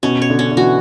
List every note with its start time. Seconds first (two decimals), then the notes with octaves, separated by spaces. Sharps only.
0.03 B2 C#4
0.22 C#5
0.30 D3
0.39 C#4
0.51 D3
0.57 E3 F#4